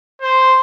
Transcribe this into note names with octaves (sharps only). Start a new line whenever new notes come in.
C5